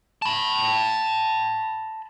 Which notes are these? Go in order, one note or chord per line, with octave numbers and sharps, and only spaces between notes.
A5 B5